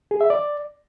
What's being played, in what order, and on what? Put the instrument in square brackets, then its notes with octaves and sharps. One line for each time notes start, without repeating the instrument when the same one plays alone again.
[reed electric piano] G#4
E5
D5